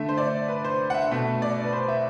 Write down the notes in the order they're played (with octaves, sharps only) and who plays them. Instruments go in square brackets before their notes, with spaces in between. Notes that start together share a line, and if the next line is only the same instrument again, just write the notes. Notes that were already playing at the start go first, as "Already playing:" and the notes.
Already playing: [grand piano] D3 A3 E5
C5
D5
B4
C5
F#5
E5
B2 A3
D5
B4
C5
E5